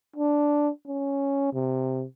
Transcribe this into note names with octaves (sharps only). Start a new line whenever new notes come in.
D4
C#4
C3